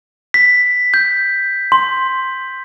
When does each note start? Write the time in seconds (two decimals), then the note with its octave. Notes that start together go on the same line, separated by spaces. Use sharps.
0.34 B6
0.94 G6
1.72 C6